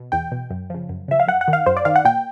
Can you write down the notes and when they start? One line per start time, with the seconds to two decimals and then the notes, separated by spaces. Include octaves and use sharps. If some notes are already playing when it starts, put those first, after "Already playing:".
Already playing: B2
0.12 E2 G5
0.32 B2
0.50 F#2
0.70 C#3 F3
0.89 F#2
1.08 C#3 F3 E5
1.20 F5
1.28 F#2 F#5
1.41 F#5
1.48 D#3
1.53 F5
1.66 F#2 C5
1.77 D5
1.85 D#3 F5
1.96 F#5
2.05 A#2 G5